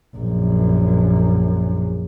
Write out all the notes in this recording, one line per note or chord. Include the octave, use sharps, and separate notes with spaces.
A#1 F#2